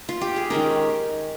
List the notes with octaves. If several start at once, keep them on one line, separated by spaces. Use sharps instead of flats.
F4
G4
G#4
D#3 G#3 C#4 G4 A#4